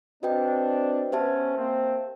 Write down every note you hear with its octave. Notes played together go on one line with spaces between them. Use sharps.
C4 D4 F#4 B4 D#5 G5
B3 C#4 G4 C5 E5 A5
A#3 C4